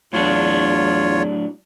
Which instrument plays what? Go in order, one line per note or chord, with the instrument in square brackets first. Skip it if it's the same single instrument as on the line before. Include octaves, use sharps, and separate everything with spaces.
[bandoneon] E2 F4 C#5 [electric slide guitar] A2 F#3 D4